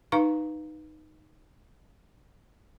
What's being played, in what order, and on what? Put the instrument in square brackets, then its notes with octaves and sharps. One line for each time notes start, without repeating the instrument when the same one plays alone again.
[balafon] D#4 B4 F5 A#5 C#6